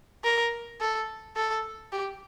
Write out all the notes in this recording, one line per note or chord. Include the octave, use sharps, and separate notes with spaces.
A#4
A4
A4
G4